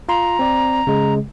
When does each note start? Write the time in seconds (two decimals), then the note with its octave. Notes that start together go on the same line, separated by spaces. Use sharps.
0.09 F4 A#5 C6
0.39 C4 D5
0.87 C#3 G#3